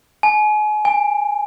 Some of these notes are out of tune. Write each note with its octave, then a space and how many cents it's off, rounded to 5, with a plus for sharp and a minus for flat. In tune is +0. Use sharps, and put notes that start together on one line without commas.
G#5 +35
G#5 -25